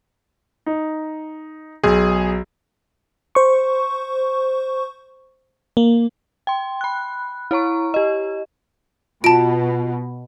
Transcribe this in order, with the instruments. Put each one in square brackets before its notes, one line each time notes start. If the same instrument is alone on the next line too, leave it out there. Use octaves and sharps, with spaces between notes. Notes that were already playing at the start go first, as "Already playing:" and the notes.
[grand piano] D#4
[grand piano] B1 [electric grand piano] G#4
[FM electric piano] C5 C#6
A#3
[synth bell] G5 C6
B5 F#6
E4 C#5 A#5 C#6
G4 D#5
[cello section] B2 [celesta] F4 [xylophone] A5 D7